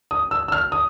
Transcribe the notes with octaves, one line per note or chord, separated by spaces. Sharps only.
D#6
E6
E6
F6
D#6